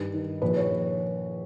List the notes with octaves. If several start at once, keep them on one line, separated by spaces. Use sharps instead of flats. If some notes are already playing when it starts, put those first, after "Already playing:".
Already playing: G2 D#3
D#3
A#1 B4
C#5